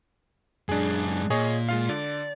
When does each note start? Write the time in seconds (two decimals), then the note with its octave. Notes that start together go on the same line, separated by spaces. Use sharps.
0.69 F#2 G#3 D4 G#4
1.30 A#2 G#4 C#5 D#5
1.69 G#3 F4 F5
1.89 D3 D5